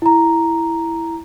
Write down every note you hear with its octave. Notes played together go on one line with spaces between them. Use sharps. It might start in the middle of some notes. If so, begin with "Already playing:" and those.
E4 A#5